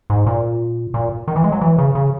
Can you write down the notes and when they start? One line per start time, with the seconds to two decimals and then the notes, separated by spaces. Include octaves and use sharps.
0.10 G#2
0.26 A#2
0.94 A#2
1.28 D#3
1.36 E3
1.44 G#3
1.52 F#3
1.61 E3
1.78 C#3
1.95 C#3